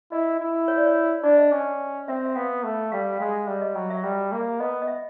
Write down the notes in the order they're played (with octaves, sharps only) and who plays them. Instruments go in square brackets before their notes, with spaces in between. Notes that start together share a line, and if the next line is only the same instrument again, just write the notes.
[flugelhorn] E4 [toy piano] D#5
[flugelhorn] E4
[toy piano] C#5
D5
C#5
[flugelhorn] D4 [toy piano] D5
[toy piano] D#5
[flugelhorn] C#4
[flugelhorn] C4 [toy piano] E5
[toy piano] E5
[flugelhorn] B3 [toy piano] F5
[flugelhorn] A3
[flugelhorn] G3 [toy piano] F5
[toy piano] F5
[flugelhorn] G#3
[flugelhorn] G3 [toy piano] E5
[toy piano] D#5
[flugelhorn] F#3
[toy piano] E5
[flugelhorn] G3 [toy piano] E5
[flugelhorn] A#3
[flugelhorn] B3 [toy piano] D#5
[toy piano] D#5
E5